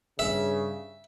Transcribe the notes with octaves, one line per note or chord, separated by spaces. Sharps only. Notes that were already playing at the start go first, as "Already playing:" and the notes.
G2 C#3 E5